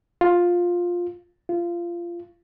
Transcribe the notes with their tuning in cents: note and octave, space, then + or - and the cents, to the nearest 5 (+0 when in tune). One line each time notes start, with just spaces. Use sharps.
F4 +10
F4 -20